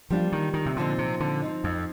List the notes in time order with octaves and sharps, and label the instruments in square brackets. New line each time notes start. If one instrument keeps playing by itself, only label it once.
[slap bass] F3 [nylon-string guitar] G3 A#3 D4 F4
[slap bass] D#3
D#3
C3
[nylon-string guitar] A#2 F3 C4 D#4 [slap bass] D3
[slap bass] C3
D3
[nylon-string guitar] F3 C4 D#4
[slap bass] F2